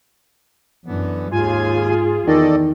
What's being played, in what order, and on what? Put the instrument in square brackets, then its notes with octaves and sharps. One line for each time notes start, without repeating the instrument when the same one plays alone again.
[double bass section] F#2 [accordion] D3 E3 B3
[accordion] D#2 G#5 [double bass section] G#2 [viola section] F4 G#4
[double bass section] E2 [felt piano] D#3 [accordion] A4 D5 D#5